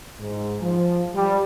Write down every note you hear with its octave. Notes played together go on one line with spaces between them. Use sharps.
G#2
F3
G3